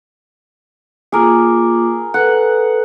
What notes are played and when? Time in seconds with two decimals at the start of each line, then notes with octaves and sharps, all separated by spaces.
1.12 A#3 F4 G#4 A#4 D6
2.14 A4 B4 F#5